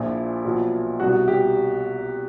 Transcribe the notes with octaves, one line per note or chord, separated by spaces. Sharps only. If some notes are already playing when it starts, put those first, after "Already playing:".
Already playing: A#1 A#2 F3 E4
B1 A#2 F3
C2 B2 F#4
G4